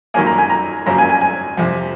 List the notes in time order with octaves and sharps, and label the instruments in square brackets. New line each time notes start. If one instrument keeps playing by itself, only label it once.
[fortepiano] F#2 D#3 F#3 A#3 G#5
A#5
G#5
A#5
F#2 C#3 F#3 A#3 A#5
G#5
G#5
G#5
F2 C3 F3